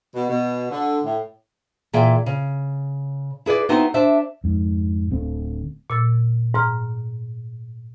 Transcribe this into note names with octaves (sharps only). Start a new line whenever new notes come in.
B2
B2
D3
A2
A#2 E3 G#4 G5
C#3
E4 G#4 B4 D5
B3 C4 D#4 E4 F#4
D4 C5 E5
F2 G#2
D1 D2 A3 C4
A#2 E6 A6
G#2 A#5 F6